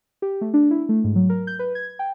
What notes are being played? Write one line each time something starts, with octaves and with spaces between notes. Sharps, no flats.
G4
A3
D4
E4
A3
G#2
F#3
A#4
G6
B4
G#6
G5